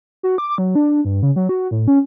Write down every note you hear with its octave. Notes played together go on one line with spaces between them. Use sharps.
F#4
D6
F#3
D4
G2
C#3
F#3
F#4
A2
C#4